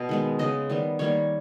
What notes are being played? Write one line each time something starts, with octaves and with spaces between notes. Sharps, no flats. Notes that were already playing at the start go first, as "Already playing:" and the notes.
Already playing: B2 D#5
D#3 G#3 B3
C#3 G#3 B3 D#5
D#3 G3 B3
D#3 G3 A#3 C#5